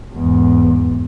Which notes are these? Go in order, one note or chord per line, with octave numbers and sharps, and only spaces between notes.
E2 G#2